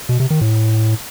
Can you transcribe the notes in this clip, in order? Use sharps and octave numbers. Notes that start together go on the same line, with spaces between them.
B2
C3
D#3
A2